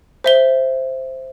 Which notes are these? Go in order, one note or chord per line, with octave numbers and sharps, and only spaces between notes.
C5 E5 G7